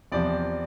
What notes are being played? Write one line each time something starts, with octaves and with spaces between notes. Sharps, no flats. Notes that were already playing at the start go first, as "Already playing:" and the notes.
E2 C3 F3 D5